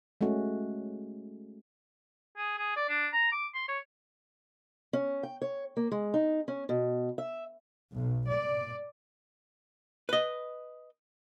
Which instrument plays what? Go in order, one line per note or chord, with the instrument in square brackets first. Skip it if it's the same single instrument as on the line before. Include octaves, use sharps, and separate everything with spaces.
[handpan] G#3 A3 C#4 F#4
[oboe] G#4
G#4
D5
D4
A#5
D6
C6
C#5
[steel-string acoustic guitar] C#4
G5
C#5
A#3
G#3
D#4
C#4
B2
E5
[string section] B1
D5
[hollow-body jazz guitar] B4 D#5